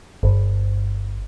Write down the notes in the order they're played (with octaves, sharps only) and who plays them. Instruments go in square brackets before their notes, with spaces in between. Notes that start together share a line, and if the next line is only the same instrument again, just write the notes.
[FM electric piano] G1